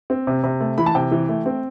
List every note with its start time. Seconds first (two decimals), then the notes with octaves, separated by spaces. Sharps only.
0.10 C4
0.27 C3
0.44 C3
0.61 A3
0.78 E3 B5
0.86 A5
0.95 C3 G5
1.11 E3
1.29 A3
1.46 C4